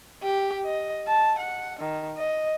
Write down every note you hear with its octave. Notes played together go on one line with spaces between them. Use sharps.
G4
D#5
A5
F#5
D#3
D#5